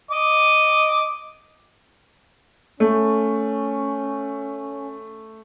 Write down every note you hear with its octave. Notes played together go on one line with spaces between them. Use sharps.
D#5 D6
A3 C#4